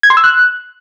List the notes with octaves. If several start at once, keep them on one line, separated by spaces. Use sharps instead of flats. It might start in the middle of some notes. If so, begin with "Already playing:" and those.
G#6
C6
E6
F#6